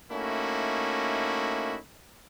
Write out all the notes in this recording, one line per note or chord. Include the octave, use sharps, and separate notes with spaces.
A3 A#3 C#4 D#4 E4 F#4